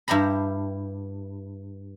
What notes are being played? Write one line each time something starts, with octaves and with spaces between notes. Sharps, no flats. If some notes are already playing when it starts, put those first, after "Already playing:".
G2 E4 G4 A#5 B5